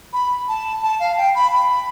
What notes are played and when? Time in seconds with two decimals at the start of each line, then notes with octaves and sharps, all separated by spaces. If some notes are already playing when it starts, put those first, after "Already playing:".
0.13 B5
0.49 A5
0.83 A5
1.00 F5
1.18 G5
1.35 B5
1.53 B5